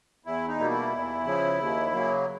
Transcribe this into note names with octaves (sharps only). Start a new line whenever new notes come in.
E2 E4
D#4
B2 G3 A#3
E4
E2
C#3 F3
D#2
C#3 F#3 A#3